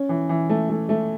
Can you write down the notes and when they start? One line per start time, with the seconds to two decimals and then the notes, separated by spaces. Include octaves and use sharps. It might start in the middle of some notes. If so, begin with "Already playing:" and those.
Already playing: C#4
0.09 E3
0.29 E3
0.50 A3
0.69 A3
0.89 A3